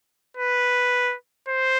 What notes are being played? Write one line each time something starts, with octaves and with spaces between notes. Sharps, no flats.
B4
C5